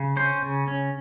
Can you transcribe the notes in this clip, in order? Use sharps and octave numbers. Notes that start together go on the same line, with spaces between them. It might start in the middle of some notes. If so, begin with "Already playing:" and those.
Already playing: C#3
C#4 C5
C#3
C#4